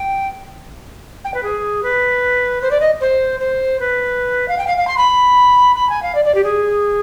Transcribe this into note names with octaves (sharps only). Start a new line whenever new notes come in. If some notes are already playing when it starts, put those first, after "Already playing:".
Already playing: G5
G5
B4
G#4
B4
C5
D5
D#5
C5
C5
B4
F5
G5
F5
F5
C6
B5
B5
G#5
F5
D5
D5
G4
G#4